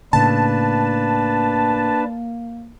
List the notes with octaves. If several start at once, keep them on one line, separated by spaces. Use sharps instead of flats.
A2 C#3 A#3 D4 B4 A5